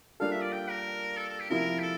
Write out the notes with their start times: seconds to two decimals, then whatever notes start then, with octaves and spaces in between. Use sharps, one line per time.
0.20 G3 A#3 D4 F4 A4 F5
0.31 E5
0.42 D5
0.53 G5
0.69 A#4
1.17 A4
1.29 A4
1.40 G4
1.50 C3 F3 A#3 E4 A#4
1.79 G4
1.82 A4